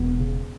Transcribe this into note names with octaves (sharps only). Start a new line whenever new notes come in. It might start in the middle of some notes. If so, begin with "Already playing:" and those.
Already playing: E1 B3
C#3